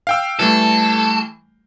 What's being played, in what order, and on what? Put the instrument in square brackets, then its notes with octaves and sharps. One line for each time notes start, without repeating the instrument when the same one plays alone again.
[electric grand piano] F5 G5 E6
[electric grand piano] E3 G3 A3 [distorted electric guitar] A4